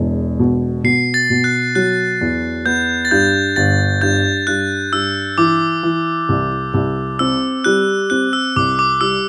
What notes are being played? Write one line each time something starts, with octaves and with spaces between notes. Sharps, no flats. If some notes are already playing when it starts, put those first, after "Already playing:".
Already playing: E1 E2
B2
B2 C7
A6
B2
F#6
F#3 F#6
E2
B3 G6
A6
G2 G6
G1 A6
G2 G6
G2 F#6
G2 E6
E3 D6
E3
C2
C2
C4 E6
G3 F#6
C4 F#6
E6
C2 D6
D6
G3 E6